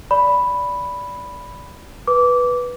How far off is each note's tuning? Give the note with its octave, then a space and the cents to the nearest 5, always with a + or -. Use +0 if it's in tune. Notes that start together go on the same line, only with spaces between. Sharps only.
D5 -15 B5 +0
B4 -5 D6 -20